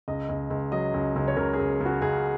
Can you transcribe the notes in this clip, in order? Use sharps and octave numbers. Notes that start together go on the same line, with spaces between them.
C#2 D#5
C#2
C#2
F#3 D#5
C#2
C#2
C#5
C#2 A#4
G#4
C#2
C#3
F#4
C#2 G#4